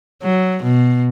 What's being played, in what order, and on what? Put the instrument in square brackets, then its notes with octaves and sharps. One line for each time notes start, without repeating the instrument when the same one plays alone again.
[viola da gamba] F#3
B2